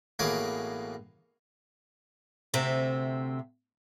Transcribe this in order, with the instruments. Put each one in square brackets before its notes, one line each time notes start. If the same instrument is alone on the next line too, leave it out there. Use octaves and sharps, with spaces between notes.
[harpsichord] A1 B2 A#3 G#4 C#5 D6
[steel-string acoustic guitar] D2 C3 C4 E5